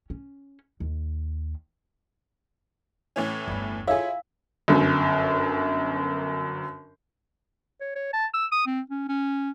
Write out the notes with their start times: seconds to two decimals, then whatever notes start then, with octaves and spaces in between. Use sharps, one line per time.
0.10 C#4
0.80 D#2
3.16 A2 E3 C#4
3.48 G1 E2 G3
3.87 E4 F4 G#4 A4 C#5 F5 E6
4.68 G1 F#2
7.81 C#5
7.96 C#5
8.13 A5
8.34 E6
8.52 D#6
8.67 C4
8.90 C#4
9.09 C#4